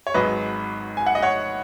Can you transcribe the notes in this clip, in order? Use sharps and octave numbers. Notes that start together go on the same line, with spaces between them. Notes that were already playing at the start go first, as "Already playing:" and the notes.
C#5
G#1 G#2 F#3 B4 D#5
G#5
F#5
D#5
C#5 F#5